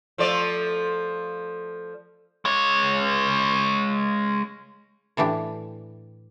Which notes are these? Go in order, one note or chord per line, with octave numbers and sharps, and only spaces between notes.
F3 A3 D5
G#3 C#5
A2 E3 D4 G4